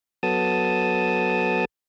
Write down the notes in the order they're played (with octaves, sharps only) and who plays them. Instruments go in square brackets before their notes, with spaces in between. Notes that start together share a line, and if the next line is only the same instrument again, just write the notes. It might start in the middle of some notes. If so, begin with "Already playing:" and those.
[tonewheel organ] F#3 B3 A4 A5 D#6